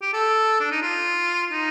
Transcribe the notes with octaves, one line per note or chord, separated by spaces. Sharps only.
G4
A4
D4
D#4
F4
D#4